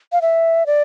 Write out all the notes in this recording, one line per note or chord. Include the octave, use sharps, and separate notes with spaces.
F5
E5
D5